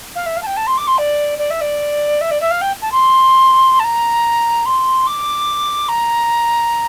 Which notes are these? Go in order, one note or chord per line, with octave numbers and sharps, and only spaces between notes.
F5
E5
F5
A5
G5
A5
C6
D6
C6
D5
D5
E5
D5
E5
D5
E5
F5
G5
A5
C6
A5
A#5
C6
D6
A#5